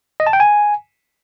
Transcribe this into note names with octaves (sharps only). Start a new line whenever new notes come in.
D#5
A5
G5
G#5